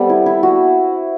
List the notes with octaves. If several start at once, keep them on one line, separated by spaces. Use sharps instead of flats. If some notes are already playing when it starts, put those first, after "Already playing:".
Already playing: G3 B3 C4 A4
E4
E4
F#4